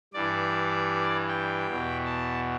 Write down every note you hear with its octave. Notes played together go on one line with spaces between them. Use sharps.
G2 E3 D5
G5
E2 B2
A5